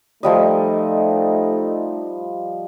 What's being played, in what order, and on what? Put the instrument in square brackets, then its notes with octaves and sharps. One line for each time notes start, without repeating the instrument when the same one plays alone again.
[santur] F3 G3 D#5 [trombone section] A3 D#4